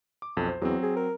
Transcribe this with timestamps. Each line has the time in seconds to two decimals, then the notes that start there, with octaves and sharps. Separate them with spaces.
0.22 D6
0.37 B1 F2 A4
0.49 C5
0.62 E2 F#3 C4
0.83 G#4
0.96 A#4